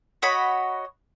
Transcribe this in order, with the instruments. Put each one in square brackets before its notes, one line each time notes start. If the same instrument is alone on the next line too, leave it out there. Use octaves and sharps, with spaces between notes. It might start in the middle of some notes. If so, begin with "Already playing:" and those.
[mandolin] F#4 C#5 D#5 B5